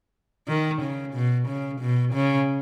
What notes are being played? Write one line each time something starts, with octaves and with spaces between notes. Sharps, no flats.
D#3
C#3
B2
C#3
B2
C#3